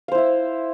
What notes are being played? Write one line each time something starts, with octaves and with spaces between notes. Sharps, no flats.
E4 C5 E5 F5